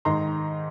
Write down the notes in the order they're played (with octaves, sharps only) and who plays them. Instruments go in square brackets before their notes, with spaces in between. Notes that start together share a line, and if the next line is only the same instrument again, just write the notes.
[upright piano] G#2 D#3 A#5 C6